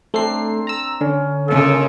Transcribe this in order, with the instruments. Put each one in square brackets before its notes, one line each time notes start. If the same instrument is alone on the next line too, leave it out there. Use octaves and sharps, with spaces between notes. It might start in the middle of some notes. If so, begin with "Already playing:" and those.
[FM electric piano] A3 C7 [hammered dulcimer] C4 D4 A#5
[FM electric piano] A#5 E6
[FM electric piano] D3 [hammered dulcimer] C#4
[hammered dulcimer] A#2 G#3 [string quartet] C#3 [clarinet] A4